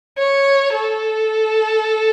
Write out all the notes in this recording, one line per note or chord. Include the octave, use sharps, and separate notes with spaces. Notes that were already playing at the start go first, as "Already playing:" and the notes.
C#5
A4